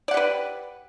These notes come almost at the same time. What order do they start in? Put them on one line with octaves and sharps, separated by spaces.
D5 F#5 G4 B4